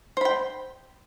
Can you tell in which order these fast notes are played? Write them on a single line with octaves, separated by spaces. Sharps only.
C5 B5 G5